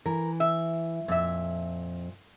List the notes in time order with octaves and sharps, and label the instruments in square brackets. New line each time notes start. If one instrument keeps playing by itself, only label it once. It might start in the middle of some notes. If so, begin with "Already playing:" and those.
[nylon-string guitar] E3 [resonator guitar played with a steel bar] A#4
[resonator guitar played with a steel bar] E5
[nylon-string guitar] F2 [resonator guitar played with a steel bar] A#2 E5